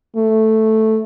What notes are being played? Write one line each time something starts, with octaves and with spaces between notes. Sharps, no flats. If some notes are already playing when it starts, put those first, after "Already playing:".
A3